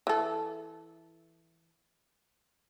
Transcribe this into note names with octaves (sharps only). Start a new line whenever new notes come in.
E3 A4